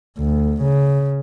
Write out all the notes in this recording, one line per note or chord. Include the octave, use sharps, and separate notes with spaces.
D2
C#3